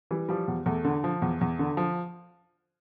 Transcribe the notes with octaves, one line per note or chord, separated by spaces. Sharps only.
E3 G3
F3 G3
E2
E2 A3
D3
F3
E2
E2
D3
F3